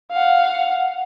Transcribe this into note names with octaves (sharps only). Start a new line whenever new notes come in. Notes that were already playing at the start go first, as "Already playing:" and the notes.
F5 F#5